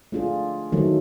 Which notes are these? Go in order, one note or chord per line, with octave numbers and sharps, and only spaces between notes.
A3 D4 F4 G#4
D#3 F#3 A3